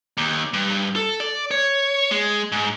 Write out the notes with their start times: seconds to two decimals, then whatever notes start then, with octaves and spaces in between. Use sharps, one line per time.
0.17 D#2
0.53 G2
0.96 A4
1.20 D5
1.51 C#5
2.11 G#3
2.52 G#2